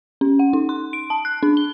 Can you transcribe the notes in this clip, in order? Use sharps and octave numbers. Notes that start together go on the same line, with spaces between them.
C#4
F#5
D#4
C6
D7
A5
F#6
D4
G7